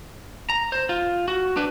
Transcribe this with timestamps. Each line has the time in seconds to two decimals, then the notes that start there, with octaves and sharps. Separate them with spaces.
0.50 A#5
0.72 C5
0.89 F4
1.28 F#4
1.57 D4 B4